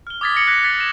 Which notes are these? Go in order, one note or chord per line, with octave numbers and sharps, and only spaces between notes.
F6 G7
D6 D#6 G#6 A6 B6
A6 A#6 C#7 F#7
D6 D#6 F#6 G#6 A#6 B6
F#6 A6 B6
A#6 E7